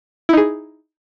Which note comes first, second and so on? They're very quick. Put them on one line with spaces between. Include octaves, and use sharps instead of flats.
E4 D#4 G#4